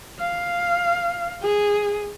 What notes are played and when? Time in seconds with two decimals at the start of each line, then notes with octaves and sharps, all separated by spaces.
0.20 F5
1.43 G#4